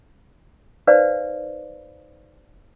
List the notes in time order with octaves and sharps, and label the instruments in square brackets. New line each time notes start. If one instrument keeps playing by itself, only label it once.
[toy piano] D#4 B4 C5 D5 F5